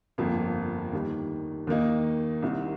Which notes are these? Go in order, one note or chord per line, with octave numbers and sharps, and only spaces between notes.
G1 F2 F3 A#3 F4
D#2 D#3 G3
D#2 D#3 A#3 D#4
C2 C3 D#3